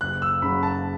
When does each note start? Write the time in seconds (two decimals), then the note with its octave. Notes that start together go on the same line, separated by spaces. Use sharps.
0.01 F#1 F#6
0.22 E6
0.42 F#2 C#3 F#3 B5
0.63 A5